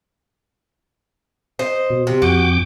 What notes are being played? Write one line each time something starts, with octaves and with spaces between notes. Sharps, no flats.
C5 D#5
B2
C3
F2 F#4 G5 D6